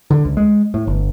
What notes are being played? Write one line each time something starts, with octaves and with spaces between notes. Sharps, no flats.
D3
C#2
G#3
A2
G1